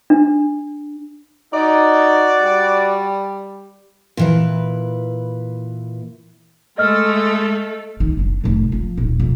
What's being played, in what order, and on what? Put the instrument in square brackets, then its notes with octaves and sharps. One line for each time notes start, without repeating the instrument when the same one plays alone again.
[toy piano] D4
[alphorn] D#4 [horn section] F#4 D5
[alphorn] G3
[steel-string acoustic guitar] A#2 E3 B4
[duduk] G#3 [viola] A3 A4 [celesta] D#5 F6
[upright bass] D#3
F#1 D4
F1 A2
F3
D#1 D#2
F2 B2